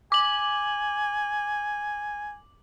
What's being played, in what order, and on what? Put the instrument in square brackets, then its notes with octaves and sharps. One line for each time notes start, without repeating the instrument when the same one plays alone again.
[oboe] G#5 [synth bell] D6 F#7